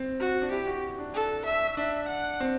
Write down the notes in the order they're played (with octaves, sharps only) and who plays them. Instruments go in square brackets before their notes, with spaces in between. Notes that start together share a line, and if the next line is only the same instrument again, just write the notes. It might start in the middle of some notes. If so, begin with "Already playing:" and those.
Already playing: [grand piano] C4
[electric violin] F#4
[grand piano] D4
[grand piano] E4 [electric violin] G4
[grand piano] F#4
D4
[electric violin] A4
E5
[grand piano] D4 [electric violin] E5
[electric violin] F#5
[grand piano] C4